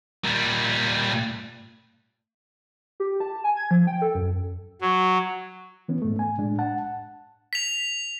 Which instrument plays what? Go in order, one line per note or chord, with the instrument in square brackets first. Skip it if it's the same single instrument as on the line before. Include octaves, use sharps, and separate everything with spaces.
[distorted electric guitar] A#2 G3
[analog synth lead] G4
A5
G#5
G#6
F3
G5
A4
F#2
[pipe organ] F#3
[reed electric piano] E3 B3 C#4
G#2 A3
G#5
A2 G#3 D4
F#5 A5
[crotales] B6 F7